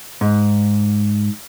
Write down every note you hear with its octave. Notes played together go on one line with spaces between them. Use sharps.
G#2